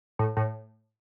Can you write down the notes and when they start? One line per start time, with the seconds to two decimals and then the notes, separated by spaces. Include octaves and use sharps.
0.19 A2
0.37 A2